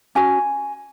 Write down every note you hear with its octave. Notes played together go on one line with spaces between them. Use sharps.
C#4 F#4 G#5